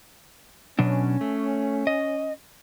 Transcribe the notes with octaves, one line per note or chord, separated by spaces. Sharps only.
B2 F#3 C#4 D4
A3
D#5